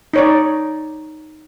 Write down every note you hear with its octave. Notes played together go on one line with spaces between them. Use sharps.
D#4 C#5 D5